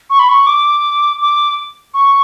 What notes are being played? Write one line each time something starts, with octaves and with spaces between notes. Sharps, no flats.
C#6
B5
C#6
D6
D6
C#6